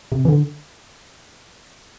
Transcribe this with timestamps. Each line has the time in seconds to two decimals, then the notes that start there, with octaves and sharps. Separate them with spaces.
0.12 C3
0.25 E3
0.29 D3